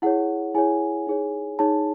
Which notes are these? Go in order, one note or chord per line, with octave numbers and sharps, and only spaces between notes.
E4 G#4 C#5 F#5
E4 G#4 C#5 G#5
D#4 G#4 C#5
D#4 G#4 C#5 A5